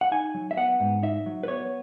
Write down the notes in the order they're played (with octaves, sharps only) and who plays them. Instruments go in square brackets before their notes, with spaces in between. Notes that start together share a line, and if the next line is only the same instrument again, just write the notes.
[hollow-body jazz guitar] F#5
D#4 G#5
F#3
E5
B3 F#5
G#2
D#4 E5
F#3
B4
B3 C#5